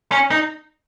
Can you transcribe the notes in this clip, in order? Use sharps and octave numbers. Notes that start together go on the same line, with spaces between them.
C#4
D#4